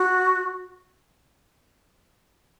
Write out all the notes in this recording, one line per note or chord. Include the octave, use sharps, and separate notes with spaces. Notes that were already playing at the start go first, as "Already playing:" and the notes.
Already playing: F#4